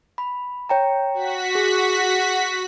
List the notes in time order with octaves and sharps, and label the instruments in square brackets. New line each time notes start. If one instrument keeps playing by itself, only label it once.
[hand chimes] B5
C#5 G5 A#5
[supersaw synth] F#4 B6
[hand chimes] G#4